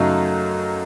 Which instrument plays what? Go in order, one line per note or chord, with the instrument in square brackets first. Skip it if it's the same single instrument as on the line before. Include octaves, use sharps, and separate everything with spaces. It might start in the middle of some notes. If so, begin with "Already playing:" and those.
Already playing: [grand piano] F#2 C#3 F#3 A3 D#4